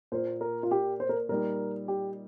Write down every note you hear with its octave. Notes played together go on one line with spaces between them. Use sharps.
A#2 A#3 F4 C5
A#4
F4
G4
C5
A#4
A#2 G3 D#4 A#4
G4